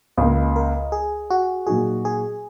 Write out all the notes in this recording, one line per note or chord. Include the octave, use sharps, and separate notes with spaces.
C#2 C#3 A#3 D#5
A#4
G#4
F#4
A#2 F#3 D#4 F#4 G#4
G#4